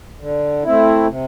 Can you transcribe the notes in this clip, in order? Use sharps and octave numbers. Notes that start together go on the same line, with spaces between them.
D3
A3 C4 E4
C3